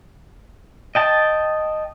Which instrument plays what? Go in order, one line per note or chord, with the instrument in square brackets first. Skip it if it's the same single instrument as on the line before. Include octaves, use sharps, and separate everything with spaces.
[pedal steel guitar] D#5 G5 A5